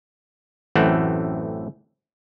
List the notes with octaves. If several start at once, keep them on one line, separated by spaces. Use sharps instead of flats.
A1 F#2 E3 A3 C4 F#5